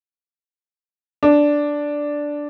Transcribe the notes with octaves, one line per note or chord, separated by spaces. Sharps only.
D4